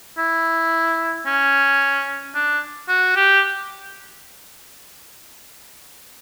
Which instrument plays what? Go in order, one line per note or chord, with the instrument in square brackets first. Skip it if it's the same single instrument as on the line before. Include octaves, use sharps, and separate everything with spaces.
[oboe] E4
C#4
D4
F#4
G4